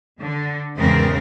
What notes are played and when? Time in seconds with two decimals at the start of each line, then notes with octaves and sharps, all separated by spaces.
0.20 D3
0.77 E2 G#2 C#3 C4 A#4